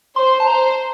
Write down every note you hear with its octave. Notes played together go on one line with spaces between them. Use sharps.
C5 C6
A5
C5 A#5